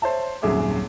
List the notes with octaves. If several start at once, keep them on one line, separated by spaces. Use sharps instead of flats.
C5 C#5 E5 A5
D#1 G#1 F#2 G#4 E5 D6